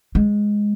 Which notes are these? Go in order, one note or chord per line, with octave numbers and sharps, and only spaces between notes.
G#3